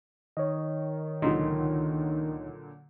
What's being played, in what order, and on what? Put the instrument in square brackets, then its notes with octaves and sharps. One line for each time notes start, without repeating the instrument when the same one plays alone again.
[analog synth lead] D#3 [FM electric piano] C#5 D#5
[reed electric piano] C#2 D#4 C6 [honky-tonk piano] A#2 D3 F#3